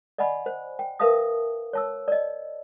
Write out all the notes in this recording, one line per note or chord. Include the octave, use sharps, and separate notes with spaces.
D5 D#5 F#5 G#5 B5
C5
G5
A#4 B4 E5 F5 A5 D#6
C#5 A5 E6
D5 D#5